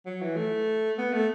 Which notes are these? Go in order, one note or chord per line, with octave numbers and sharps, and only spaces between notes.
F#3
E3
A3
B3
A3